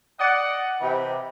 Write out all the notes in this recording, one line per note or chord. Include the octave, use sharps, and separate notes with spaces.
D5 D#5 F#5
C3 E3 G4 D#5 B5